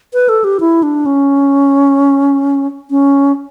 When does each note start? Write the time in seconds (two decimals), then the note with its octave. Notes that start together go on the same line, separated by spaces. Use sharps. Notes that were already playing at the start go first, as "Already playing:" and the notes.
0.13 B4
0.29 A4
0.44 G4
0.60 E4
0.83 D4
1.06 C#4
2.91 C#4